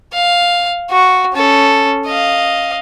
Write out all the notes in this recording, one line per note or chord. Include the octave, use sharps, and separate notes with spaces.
F5
F#4
C#4 A4
D#5 F5